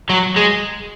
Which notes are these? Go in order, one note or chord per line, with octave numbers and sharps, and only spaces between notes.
F#3
G#3